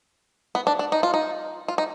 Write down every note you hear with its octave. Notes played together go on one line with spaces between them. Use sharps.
B3
D4
D4
D#4
F4
D#4
F4
D#4